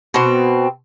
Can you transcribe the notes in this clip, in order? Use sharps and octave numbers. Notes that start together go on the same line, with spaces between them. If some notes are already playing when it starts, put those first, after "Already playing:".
B2 C4